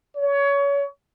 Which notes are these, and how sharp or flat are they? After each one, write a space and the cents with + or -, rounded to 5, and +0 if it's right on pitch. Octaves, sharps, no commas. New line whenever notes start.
C#5 +25